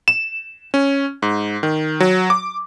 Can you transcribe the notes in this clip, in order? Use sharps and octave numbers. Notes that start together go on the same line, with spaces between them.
E7
C#4
G#2
D#3
F#3
D6